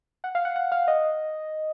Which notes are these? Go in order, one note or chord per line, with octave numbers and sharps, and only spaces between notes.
F#5
F5
F#5
F#5
F5
D#5